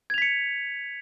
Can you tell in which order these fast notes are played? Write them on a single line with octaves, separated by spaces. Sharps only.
G#6 F7 B6 C#7